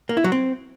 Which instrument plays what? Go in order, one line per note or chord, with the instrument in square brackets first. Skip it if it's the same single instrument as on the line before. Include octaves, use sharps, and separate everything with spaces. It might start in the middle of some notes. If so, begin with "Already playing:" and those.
[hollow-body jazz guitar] A#3
E4
F#3
C4